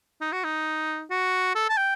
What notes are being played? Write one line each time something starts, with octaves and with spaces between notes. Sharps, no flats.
D#4
F#4
D#4
F#4
A4
A5
G5